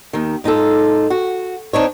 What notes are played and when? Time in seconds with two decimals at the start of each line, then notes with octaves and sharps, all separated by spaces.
0.13 D#2 D#3
0.44 G#2 D#4 F4 A4
1.10 F#4
1.73 C4 D4 D#4 C#5